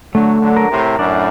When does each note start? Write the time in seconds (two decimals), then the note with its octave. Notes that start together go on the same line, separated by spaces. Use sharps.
0.14 D3 F#3 A3
0.42 D3 F#3
0.57 A#4
0.71 A2 C3
0.99 F#2 A2 D4